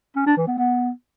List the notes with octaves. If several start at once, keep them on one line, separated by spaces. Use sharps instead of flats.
C#4
D4
E3
B3
B3